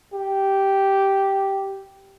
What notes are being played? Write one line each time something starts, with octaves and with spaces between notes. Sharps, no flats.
G4